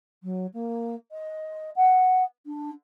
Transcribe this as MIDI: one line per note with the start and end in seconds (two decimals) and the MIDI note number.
0.23 0.46 54
0.53 0.95 58
1.11 1.70 75
1.76 2.23 78
2.46 2.70 62